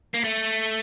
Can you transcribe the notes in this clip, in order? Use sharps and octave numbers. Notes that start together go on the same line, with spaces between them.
A#3
A3